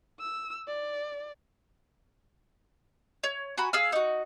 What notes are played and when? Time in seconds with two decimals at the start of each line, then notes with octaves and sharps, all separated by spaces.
0.20 E6
0.68 D5
3.24 C#5
3.58 F#4 G#5 A#5 B5
3.73 G#4 F5 E6 F6
3.92 D#4 F#4